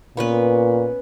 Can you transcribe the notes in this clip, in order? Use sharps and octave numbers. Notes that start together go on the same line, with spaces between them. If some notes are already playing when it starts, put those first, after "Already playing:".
A#2 B3 C#4 B4